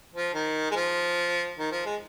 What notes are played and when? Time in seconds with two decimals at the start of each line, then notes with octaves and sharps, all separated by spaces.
0.14 F3
0.34 D#3
0.71 G#3
0.76 F3
1.58 D#3
1.72 F3
1.86 G#3